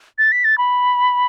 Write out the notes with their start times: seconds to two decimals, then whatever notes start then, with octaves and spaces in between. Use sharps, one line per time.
0.18 A6
0.32 B6
0.44 A6
0.58 B5